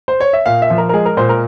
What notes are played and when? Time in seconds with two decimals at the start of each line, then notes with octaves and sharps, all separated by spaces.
0.08 C5
0.20 C#5
0.33 E5
0.46 A#2 F5
0.62 E5
0.70 F3
0.78 A#4
0.89 A#4
0.93 G#3 G#4
1.05 A#4
1.17 A#2 C5
1.29 A#4